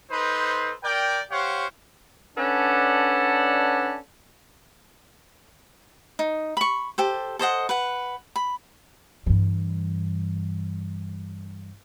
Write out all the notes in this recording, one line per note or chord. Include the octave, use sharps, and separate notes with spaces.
D#4 A4 B4 C5
A#4 D5 G5
G4 C5 C#5 F5 F#5
C#4 D4 A4 B4 D5 F#5
D#4
B5 C#6
G4 A4 C5
A4 C5 D#5 F#5
B4 F#5
B5
G2 E3